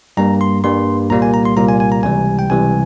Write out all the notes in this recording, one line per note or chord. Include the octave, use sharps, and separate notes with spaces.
G2 G3 A#3 A#5
C6
G2 G3 A#3 C6
C2 A#2 G3 A#3 A#5
G#5
A#5
C6
C2 A#2 G3 A#3 A#5
G#5
G#5
A#5
C#2 C3 E3 G3 G#5
G5
C#2 C3 E3 G3 G#5